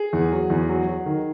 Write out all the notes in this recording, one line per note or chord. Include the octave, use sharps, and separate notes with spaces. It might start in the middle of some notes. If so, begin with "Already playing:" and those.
Already playing: G#4
E2
F#3
E2
F#3
F#3
D#3